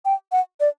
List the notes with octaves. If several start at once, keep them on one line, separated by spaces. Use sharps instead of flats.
G5
F#5
D5